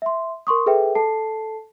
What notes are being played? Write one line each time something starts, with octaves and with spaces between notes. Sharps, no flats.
E5 C6
A#4 C6 C#6 D#6
G#4 A4 B4 E5 G5
A4 A5 C7